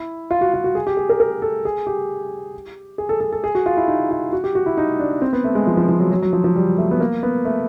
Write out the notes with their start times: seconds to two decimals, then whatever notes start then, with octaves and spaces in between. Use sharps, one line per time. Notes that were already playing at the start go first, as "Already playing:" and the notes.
Already playing: E4
0.31 F4
0.41 F#4
0.54 F4
0.64 F#4
0.75 G#4
0.87 G4
0.97 G#4
1.09 A#4
1.20 A#4
1.42 A4
1.65 G#4
1.87 G4
2.98 G#4
3.09 A4
3.20 A4
3.32 A4
3.44 G#4
3.55 F#4
3.66 F4
3.77 E4
3.88 D#4
4.11 F4
4.33 F#4
4.44 G4
4.55 F#4
4.66 E4
4.77 D#4
5.00 D4
5.22 C4
5.33 B3
5.44 A3
5.55 G#3
5.67 F3
5.77 F3
5.89 F3
6.00 F#3
6.11 F#3
6.22 F#3
6.33 F3
6.44 F3
6.56 G3
6.78 A3
6.91 B3
7.00 A#3
7.23 B3
7.45 A3